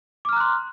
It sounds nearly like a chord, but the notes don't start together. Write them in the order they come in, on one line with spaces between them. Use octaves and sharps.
D6 F6 A#5 F#6 C6